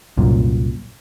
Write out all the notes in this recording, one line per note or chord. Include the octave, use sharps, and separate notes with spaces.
C2 F#2 A#2